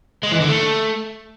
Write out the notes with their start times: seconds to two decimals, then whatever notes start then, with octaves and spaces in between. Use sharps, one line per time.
0.23 G#3
0.32 E3
0.40 D3
0.49 A3